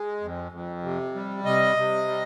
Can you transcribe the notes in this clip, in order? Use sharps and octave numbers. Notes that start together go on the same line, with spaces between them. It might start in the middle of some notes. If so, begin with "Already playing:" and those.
Already playing: G#3
F2
F2
C3
G3
C3 D#5
C3
G3